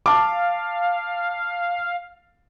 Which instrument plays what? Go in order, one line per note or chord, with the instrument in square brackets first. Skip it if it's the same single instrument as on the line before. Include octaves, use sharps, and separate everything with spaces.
[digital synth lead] F5 [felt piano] A5 D6